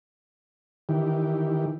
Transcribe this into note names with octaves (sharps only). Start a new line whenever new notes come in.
D#3 E3 G4